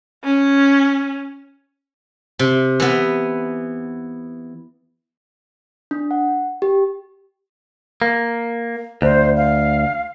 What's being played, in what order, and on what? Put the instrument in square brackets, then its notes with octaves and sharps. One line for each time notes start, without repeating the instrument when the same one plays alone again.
[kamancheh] C#4
[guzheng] C3
E3 B3
[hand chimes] D4
F#5
G4
[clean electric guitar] A#3
[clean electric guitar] D2 [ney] C5
[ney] F5